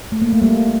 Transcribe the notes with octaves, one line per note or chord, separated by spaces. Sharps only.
A3
A#3
A3
G3 A#3